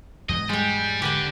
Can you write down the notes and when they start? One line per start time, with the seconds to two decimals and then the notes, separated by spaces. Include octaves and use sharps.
0.29 E2 G#2 F#3 D#5
0.49 G3 G#3 G5
1.02 D3 G4 B4 F#5